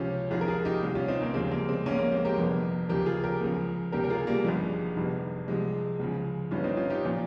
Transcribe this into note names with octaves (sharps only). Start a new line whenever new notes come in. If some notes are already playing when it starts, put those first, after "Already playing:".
Already playing: C#2 C3 F3 C#4 F4 G4
G#1 G#2 F3 F4 G#4
A#4
F4 G#4
D#4 G4
C2 C3 D#3
C#4 F4
C4 D#4
A#3 C#4
D#2 C#3 F3 G#3 C4
G3 A#3
G#3 C4
A#1 G#2 D#3 A#3 C#4
A#3 C#4
G#3 C4
G4 A#4
G1 F2 C3 F3
D#2 C#3 F3 G4 A#4
F4 G#4
G4 A#4
C#2 C#3 F3
C#2 C3 D#3 G4 A#4
A#4
F4 G#4
G3 A#3
G#1 G2 F3 G#3
G1 F2 C3 D#3
C2 C3 F3 G#3
C#2 C#3 F3
G1 G2 D#3 C#4 F4
C4 D#4
C#4 F4
D#4 G4
A#2 F3